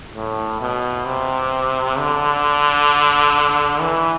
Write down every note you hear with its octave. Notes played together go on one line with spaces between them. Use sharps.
A2
B2
C3
D3
E3